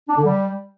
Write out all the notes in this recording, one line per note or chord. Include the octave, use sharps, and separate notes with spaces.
D4
D3
G3